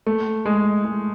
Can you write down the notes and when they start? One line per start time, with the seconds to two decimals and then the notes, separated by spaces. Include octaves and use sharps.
0.07 A3
0.46 G#3
0.85 G#3